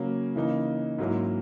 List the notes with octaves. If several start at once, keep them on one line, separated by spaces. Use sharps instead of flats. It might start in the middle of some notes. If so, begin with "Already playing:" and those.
Already playing: C#3 F#3 A#3 C#4
C#3 E3 A#3 D#4
G#2 F#3 A#3 C#4 E4